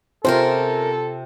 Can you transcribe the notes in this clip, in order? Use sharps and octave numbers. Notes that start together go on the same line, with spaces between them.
C3 C4 C#4 F4 A4 A#4 C5